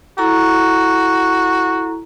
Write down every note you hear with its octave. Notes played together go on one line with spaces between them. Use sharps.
E4 F#4 A4 A#5